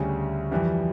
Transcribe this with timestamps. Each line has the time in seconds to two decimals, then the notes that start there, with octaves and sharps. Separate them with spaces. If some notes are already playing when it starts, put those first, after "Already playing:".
Already playing: D2 C#3 G3
0.52 F2 E3 G3